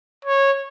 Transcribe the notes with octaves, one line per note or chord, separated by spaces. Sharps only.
C#5